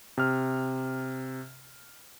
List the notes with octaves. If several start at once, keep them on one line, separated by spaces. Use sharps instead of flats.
C3 F6